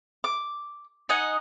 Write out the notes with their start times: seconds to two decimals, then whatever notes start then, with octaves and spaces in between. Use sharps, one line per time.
0.24 D6
1.09 D#4 D#5 F#5 G#5